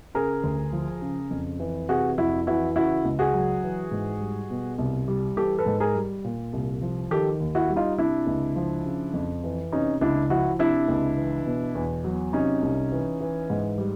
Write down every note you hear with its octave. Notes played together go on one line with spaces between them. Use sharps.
C#3 G#4 A#4
D2
F3
C#3
F2
E3
C3 F#4 G#4
F2 E4 F#4
E3 E4 F#4
C#3 E4 F#4
C#2
F#4 G#4
F#3
E3
G#2
G3
B2
C2
G3
E3 G4 A4
A4 B4
G#2
G#4 A#4
G3
A#2
C2
F3
D#3 G4 A4
D#2
E4 F#4
G3
D#4 F4
C3 D4 E4
C#2
F3
C#3
F2
E3
C3 C#4 D#4
C#2 D4 E4
F3 E4 F#4
C3 D4 E4
C#2
E3
B2
E2
F#3
C3 C#4 D#4
C2
E3
E3
G#2
G3